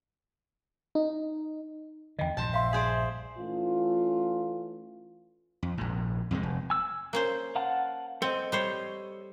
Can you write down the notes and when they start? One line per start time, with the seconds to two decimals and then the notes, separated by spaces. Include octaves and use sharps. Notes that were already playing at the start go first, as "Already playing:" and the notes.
0.95 D#4
2.19 E2 D3 D#5 G5
2.37 A#1 G2 C5 A5
2.54 E5 F5 C6
2.73 G#4 C5 D5
3.37 E3 A3 C#4 F4
5.63 F2
5.78 A#1 G#2
6.31 F2 C3 G3 G#3
6.43 F1
6.70 G#5 E6
7.13 A#3 C#4 C5
7.56 F5 F#5 A5
8.22 C4 A4 D#5
8.52 G3 C5 C#5